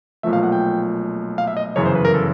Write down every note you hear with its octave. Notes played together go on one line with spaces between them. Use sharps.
B1 A#2 F3 A3 E5
F5
F#5
G5
F5
E5
D#5
G1 F#2 C#3 E3 C#5
C5
B4
A#4
A4